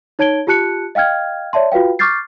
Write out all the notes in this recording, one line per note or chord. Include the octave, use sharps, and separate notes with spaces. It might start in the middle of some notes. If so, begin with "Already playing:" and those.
D#4 C#5 A5 G#6 D7 G7
F4 G4 A5 F#6 C#7
D#5 F5 G5 F6 G#6
C#5 D5 E5 A5 C6
F4 F#4 B4 F5 G5
C#6 D6 F6 G6 A6 C7